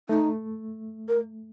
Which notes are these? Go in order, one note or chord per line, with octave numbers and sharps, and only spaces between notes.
A3 D#4
A#4